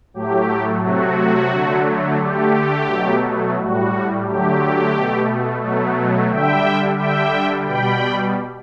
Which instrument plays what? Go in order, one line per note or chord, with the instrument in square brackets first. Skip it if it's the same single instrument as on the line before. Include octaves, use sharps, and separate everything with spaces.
[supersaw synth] A2 F#3 A3 G4
C3 F#3 A3 F#4
D3 F#3 A3
D3 A3 G4
B2 F#3 A3
A2 G3 F#4
D3 F#3 A3 G4
B2 A3
B2 F#3 A3
D3 G3 E5 G5
D3 G3 E5 G5
B2 G3 G5 B5